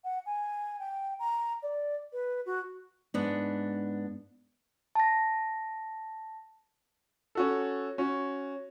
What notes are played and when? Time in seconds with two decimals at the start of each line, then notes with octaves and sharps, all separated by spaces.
0.04 F#5
0.26 G#5
0.79 G5
1.19 A#5
1.63 D5
2.13 B4
2.46 F#4
3.14 G#2 B3 D4
4.95 A5 A#6
7.35 C#4 F#4 A4
7.98 C#4 F#4